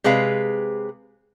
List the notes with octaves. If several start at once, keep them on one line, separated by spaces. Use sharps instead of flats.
C3 G#3 G#4 B4 F5